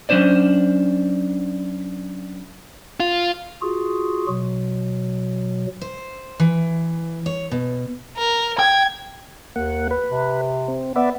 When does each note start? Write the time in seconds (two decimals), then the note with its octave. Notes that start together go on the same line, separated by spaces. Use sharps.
0.09 F#3 C#4 D4 C5 D5
3.00 F4
3.62 F4 F#4 G#4
4.28 B2 F#3
5.81 C5
6.40 E3
7.26 C#5
7.51 B2
8.18 A#4
8.59 G5 G#6
9.56 D#2 A#3 F#5
9.91 B4
10.10 C3
10.68 C4
10.96 B3 B4 D5 E5